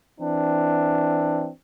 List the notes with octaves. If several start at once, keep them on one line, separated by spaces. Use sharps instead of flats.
E3 C4 D4